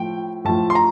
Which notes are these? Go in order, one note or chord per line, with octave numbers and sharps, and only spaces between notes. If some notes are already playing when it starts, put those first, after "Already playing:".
Already playing: A2 F3 G5
A2 F3 A5
C6
A#5